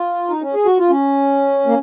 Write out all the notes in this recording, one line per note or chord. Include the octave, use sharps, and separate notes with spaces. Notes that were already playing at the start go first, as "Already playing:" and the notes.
Already playing: F4
D#4
C#4
G#4
F#4
F4
C#4
A#3